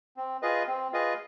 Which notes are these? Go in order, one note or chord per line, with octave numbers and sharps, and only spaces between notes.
C4
F4 G#4 B4 D#5
C4
F4 G#4 B4 D#5